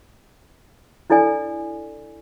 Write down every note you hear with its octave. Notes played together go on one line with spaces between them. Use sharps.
D4 E4 A4 D5 G#5